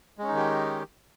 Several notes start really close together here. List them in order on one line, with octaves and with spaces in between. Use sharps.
G#3 C#4 D#4 D#3 G4